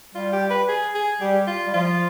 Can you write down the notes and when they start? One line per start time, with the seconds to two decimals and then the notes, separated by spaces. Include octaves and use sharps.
0.15 G3 F4
0.32 G4
0.50 B4
0.68 G#4
0.95 G#4
1.21 G3 G4
1.47 F4
1.67 G3
1.74 F3 F4